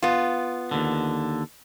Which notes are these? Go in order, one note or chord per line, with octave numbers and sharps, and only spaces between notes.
B3 F4
D#2 D3